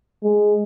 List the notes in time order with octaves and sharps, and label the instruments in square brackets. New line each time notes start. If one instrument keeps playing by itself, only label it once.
[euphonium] G#3